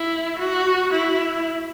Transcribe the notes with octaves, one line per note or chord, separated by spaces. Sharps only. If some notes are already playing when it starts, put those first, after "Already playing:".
Already playing: E4
F#4
E4